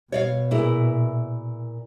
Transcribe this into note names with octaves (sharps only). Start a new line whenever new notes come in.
B2 C#5 D5 F5
A#2 E4 G#4